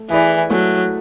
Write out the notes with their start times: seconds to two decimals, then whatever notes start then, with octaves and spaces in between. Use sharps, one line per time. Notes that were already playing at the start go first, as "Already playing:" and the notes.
Already playing: A3
0.10 E3 E4 G#4 B4 D5
0.50 F#3 A3